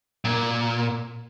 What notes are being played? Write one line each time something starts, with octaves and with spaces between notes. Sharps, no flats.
A#2